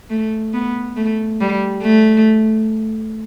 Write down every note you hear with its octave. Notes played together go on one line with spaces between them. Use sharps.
A3
B3
A3
G3
A3